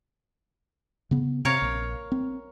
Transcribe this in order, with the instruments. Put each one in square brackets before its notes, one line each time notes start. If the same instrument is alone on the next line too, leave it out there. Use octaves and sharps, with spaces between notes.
[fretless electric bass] C#3 B3
[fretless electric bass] C3 [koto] A#4 C#5 F5
[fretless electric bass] A#1
C4